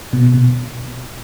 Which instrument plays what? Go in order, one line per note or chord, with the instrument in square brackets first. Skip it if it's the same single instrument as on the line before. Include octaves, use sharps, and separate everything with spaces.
[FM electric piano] B2
B2